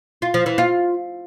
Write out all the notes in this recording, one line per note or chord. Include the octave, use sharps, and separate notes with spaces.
F4
F3
E3
F4